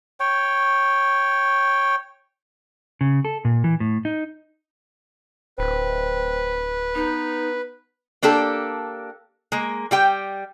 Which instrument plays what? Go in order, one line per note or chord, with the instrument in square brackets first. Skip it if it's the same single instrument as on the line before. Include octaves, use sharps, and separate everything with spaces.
[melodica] C#5 G5
[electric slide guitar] C#3
A4
A#2
E3
A2
D#4
[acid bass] D1 [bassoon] C4 [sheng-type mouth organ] B4
[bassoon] B3 [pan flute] D#4
[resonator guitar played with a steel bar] A#3 D4 G4 A4
G#3 A#3
G3 G4 G5